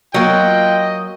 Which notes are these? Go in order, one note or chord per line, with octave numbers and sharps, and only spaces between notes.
F#3 A#3 F4 D#5 G5